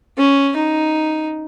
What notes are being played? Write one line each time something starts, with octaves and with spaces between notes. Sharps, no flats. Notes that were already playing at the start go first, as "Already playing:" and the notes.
C#4
D#4